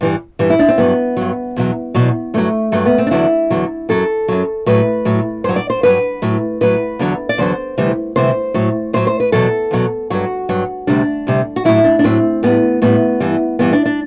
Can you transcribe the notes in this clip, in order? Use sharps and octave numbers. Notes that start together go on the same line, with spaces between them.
G2 E3 G3
G2 E3 G3
E4
D4
C4
G2 F#3 B3
G2 F#3
E2 B2 F#3
E2 B2 F#3
G2 F#3 A3
G2 F#3 A3
B3
C4
D4
E2 D3 F#3 E4
E2 D3 F#3
F#2 F#3 A4
F#2 F#3
A2 F#3 B4
A2 F#3
G2 F#3 C5
D5
C5
G2 F#3 B4
A2 F#3
A2 F#3 B4
E2 D3 F#3
D5
E2 D3 F#3 C5
D2 C3 E3 G3
D2 C3 E3 G3 C5
A2 F#3
A2 F#3 C5
C5
B4
E2 B2 F#3 A4
E2 B2 F#3
G2 F#3 F#4
G2 F#3
D2 C3 G3 D4
D2 C3 G3
F#4
A2 F#3 E4
D4
D4
A2 F#3 C4
A2 G3 B3
A2 G3 B3
G2 E3 G3
G2 E3 G3 B3
D4
D4